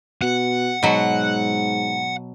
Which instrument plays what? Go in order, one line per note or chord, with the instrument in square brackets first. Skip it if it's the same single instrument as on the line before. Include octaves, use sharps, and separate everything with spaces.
[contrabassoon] B2 [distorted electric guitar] F#5
[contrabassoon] G#2 [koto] B2 F#3